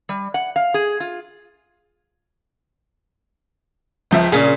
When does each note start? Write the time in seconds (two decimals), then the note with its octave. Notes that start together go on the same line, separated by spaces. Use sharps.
0.09 G3
0.34 F#5
0.56 F5
0.74 G#4
1.00 F4
4.11 C#2 F3 E5
4.32 A#2 C#3 G#4